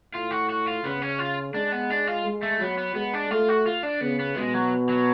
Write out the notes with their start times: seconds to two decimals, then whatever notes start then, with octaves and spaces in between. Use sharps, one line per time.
0.14 A2 F4
0.31 F#4
0.49 F#4
0.67 F4
0.84 C#3 B3
1.02 C#4
1.19 F4
1.54 G#3 D4
1.72 B3
1.90 D4
2.07 F4
2.25 G#3
2.43 A3
2.60 F#3 B3
2.78 B3
2.95 G#3 B3
3.14 D4
3.31 A3 F4
3.49 F#4
3.66 F4
3.83 D4
4.01 C#3 B3
4.19 B3
4.36 B2 G#3
4.54 F#3
4.89 F#3